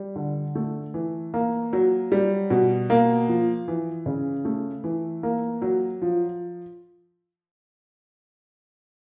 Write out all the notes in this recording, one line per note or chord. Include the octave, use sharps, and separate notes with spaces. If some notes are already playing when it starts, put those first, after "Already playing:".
Already playing: G3
D3
A3
E3
A#3
F#3
G3
B2
A#3
F3
E3
C#3
A3
E3
A#3
F#3
F3